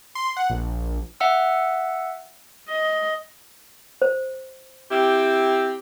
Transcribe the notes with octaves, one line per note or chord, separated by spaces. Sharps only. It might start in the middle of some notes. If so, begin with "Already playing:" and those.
C6
F#5
A#1
E5 F#5 E6
D#5
C5
C4 E4 G4